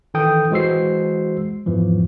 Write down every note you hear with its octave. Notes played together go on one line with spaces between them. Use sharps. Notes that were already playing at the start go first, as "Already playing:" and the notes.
D#3 E3 A4 G5 D#6 G6
E3 G#3 F#4 C5 E6 C7
E2 G#2 E3 F3